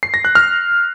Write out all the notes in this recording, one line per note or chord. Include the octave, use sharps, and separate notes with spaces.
C7
A#6
F#6
F6